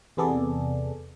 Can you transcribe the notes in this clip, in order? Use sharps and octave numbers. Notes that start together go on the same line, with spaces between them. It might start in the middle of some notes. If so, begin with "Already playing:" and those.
E2 C3 B3 G#4 A4 D5